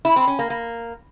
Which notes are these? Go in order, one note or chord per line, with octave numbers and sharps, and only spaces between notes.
E4
C4
C#4
A#3
A#3